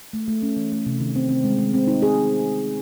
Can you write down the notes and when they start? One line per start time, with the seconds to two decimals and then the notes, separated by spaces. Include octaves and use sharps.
0.13 A3
0.28 A3
0.42 C#4
0.57 E3
0.72 A3
0.86 C3
1.00 D#3
1.16 C4
1.29 C4
1.44 G#3
1.58 G#3
1.74 C4
1.87 D#4
2.02 G#4